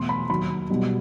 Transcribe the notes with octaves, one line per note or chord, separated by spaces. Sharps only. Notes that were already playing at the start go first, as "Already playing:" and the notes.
Already playing: E2 B2 A3 C6
B5
D#2 D#3 F#3 B5
B2 G3 D#4